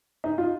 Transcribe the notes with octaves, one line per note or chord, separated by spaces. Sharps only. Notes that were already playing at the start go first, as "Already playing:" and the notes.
D#4
F4